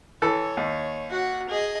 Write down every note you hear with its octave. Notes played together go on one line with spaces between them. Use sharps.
E3 A4 C#5
D#2
F#4 F#5
G#4 D#5